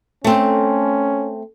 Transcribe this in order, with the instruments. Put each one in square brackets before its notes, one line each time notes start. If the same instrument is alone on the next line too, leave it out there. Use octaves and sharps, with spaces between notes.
[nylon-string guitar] A3 C4 [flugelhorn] C#4